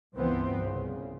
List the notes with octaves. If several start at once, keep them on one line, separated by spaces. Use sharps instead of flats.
C#2 G2 E3 F3 B3 C4
C2 C#3